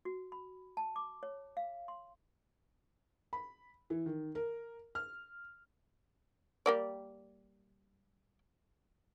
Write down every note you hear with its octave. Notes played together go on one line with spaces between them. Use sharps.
F#4
B5
A5
D6
C#5
F5
C6
B5
E3
D#3
A#4
F6
G3 A#3 D5